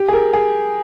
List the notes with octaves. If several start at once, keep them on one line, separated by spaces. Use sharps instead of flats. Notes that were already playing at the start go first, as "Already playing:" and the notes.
Already playing: G4
G#4
A#4
G#4